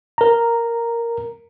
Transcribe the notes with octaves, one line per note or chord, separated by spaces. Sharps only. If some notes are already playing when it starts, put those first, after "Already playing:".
A#4 A#5